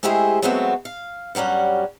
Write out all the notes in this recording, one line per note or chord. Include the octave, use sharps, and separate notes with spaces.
G#3 A3 E4 G4 G#4 C5
F#3 G#3 A3 B3 C4 F#4
F5
G2 F#3 G3 C#4 F#5